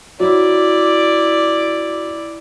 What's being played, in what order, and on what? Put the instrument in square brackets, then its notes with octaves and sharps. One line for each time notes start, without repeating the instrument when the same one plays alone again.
[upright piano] F#3 [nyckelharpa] E4 D5